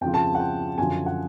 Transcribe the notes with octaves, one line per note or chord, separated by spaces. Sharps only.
F2 C#3 F3 G5
A5
F#5
G5
F#2 D3 F3 G#5
F#5